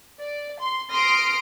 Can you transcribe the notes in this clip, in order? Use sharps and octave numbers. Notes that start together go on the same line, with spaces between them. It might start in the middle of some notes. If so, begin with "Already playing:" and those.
D5
C6
C6 D#6 F6 A#6 C7 D7